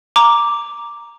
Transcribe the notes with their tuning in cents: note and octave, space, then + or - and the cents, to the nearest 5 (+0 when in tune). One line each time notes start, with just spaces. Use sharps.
A#5 +0 D6 +0